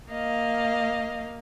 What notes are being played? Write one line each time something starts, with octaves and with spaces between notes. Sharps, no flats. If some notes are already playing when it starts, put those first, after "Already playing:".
A#3 D#5 F5